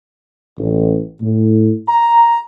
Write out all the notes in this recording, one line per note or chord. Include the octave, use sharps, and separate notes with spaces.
A1
A2
A#5